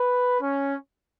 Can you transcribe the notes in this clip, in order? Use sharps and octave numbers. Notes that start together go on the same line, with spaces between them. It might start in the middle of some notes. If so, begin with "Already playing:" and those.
Already playing: B4
C#4